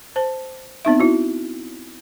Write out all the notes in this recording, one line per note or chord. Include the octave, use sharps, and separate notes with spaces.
C5 A5
B3 C4 D#4 E5
E4 F#4